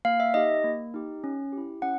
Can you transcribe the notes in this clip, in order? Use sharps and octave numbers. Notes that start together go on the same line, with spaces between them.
A#3 F5
E5
D#4 G4 D#5
A#3
D#4 G4
C#4
E4 G4
C#4 F#5